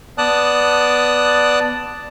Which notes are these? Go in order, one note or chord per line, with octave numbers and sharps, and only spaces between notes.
B3 D5 A5 D#6 F#6